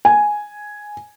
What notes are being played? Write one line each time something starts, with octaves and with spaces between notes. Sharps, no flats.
G#5